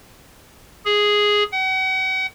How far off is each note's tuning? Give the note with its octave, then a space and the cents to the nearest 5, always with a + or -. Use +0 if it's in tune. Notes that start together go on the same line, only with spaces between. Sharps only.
G#4 +0
F#5 +40